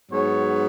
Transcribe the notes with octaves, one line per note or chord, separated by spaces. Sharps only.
G#2 F#3 B3 C#5